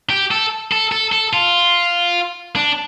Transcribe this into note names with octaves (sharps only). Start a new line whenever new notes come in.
G4
A4
A4
A4
A4
F4
D4